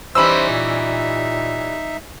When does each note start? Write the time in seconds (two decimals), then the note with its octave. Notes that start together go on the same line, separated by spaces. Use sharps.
0.15 E3 G3 C#4 D#4 C5 E5 B5 E6
0.49 A#2